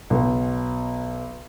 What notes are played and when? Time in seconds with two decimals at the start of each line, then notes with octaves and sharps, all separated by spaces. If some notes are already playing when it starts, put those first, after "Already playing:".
0.10 B1 B2